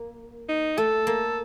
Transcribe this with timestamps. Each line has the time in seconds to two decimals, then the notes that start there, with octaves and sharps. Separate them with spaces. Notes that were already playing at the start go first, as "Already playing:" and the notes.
Already playing: A#3
0.49 D#4
0.78 A3 A4
1.07 A#3